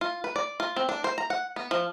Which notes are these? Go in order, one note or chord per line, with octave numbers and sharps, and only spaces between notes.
F4
B4
D5
F4
C4
D4
C5
A#5
F#5
B3
F3